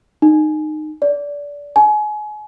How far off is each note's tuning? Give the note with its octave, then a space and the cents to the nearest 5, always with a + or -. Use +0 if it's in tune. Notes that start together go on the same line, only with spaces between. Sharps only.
D#4 -20
D5 -25
G#5 +30